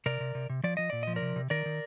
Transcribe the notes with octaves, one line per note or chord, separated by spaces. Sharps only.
C3 A#4 D5
C3
C3
C3
F3 D5
F3 D#5
A#2 D5
F3 D#5
A#4 D5
C3
C3
D#3 A#4 D5
D#3